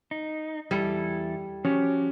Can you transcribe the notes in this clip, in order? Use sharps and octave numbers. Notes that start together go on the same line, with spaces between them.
D#4
E2 G3 E4 A4
F3 C#4 F#4 G4